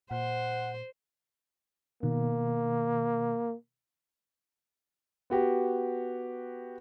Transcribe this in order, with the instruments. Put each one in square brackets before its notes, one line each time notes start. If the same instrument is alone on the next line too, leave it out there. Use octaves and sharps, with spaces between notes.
[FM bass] A#2 [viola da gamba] C5 [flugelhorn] F#5
[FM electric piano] B2 D#3 [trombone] A#3
[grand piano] B3 F#4 G4